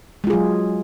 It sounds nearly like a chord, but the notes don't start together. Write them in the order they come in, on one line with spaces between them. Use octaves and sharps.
G#3 F4 G#4 F#3